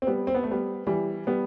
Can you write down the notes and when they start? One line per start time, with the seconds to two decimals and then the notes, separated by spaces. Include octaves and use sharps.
0.02 C4
0.07 G3 B3
0.27 C4
0.35 B3
0.43 A3
0.51 G3 B3
0.87 E3 G3
1.27 G3 B3